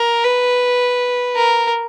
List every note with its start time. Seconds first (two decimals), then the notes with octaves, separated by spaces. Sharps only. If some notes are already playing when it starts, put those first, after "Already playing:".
Already playing: A#4
0.24 B4
1.36 A#4